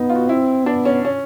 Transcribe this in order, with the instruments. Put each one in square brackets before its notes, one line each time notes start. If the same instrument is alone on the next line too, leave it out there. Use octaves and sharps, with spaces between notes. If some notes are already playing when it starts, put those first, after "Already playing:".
Already playing: [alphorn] B3 [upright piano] D#4
[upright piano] F4
F#4
[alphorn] C4 [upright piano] E4
[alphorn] B3 [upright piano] D4
[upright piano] C#4
C#4